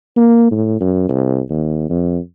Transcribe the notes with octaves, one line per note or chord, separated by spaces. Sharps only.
A#3
A2
F#2
C2
D#2
F2